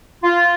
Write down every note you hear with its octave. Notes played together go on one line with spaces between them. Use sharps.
F4